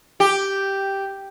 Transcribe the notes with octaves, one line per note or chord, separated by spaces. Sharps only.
G4